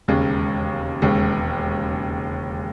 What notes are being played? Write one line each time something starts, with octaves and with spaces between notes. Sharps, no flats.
E1 D#2 C#3 G#3 C#4
E1 D#2 C#3 G#3 C#4